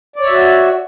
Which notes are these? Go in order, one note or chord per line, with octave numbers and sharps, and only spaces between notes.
F#4 C#5 D5 E5